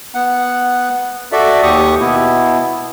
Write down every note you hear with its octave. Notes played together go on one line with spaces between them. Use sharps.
B3 F#5
F#4 A4 D5 E5
D#2 G4 C#6 D#6
B2 B3 E4